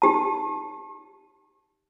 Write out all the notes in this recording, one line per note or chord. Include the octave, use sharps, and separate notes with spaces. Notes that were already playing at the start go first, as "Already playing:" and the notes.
D#4 G4 A5